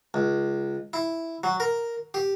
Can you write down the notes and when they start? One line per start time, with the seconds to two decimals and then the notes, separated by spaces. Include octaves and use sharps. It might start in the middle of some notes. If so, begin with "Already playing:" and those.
0.14 C#2
0.93 E4
1.44 F#3
1.60 A#4
2.14 G4